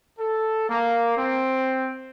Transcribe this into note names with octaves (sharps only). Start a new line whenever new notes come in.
A4
A#3
C4